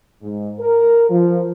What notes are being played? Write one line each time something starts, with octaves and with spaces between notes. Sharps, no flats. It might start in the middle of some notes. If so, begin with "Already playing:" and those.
G#2
A#4
F3